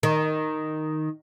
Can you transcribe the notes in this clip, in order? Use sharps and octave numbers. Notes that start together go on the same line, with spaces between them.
D#3